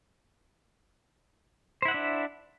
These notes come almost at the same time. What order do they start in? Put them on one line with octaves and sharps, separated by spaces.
C5 E4 F#5 E5 D4